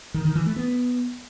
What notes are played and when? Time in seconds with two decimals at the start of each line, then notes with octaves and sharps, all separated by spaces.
0.14 D#3
0.25 D#3
0.35 E3
0.46 A3
0.56 B3